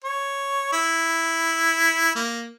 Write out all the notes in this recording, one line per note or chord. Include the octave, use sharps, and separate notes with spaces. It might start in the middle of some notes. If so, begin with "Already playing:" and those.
C#5
E4
A#3